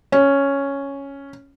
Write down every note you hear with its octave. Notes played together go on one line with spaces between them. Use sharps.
C#4